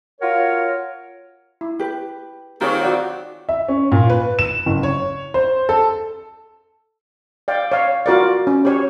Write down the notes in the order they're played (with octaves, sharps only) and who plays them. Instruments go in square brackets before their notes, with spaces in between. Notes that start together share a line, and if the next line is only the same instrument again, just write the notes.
[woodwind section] F4 F#4 A#4 C#5
[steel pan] E4
[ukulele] G4 B4
[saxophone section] D#3 C4 [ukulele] F4 [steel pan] G4 G#4 C#5
[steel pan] F#4 D5 F#5
[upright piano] E5
C#4
A#2
B4
E7
F#1
C#5
C5
A4
[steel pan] D5 F5 G5
C#5 F5
F4 F#4 A#4 D5
C#4
G4 C#5